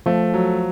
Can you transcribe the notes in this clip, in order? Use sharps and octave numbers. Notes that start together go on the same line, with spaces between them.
F3 A3
F#3